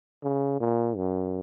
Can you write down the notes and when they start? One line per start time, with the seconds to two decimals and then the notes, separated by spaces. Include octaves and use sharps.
0.24 C#3
0.60 A#2
0.97 F#2